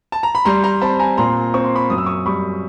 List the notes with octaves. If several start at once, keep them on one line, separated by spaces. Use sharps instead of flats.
A5
A#5
B5
G3 A#5 C6
A#5 C6
C4 A5 B5
G#5 A#5
A#2 A#5 C6
C4 C#6
C6
B5 C#6
F#2 D#6
E6
C#6 D#6
G3 B5 C#6